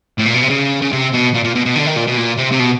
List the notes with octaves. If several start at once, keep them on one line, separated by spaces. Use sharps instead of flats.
A2
A#2
B2
C3
C#3
C#3
C3
B2
A#2
A#2
B2
B2
D3
D#3
A#2
B2
A#2
C3
C3
B2